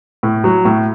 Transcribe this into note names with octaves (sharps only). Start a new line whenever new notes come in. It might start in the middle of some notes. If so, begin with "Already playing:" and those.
A2
F#3
A2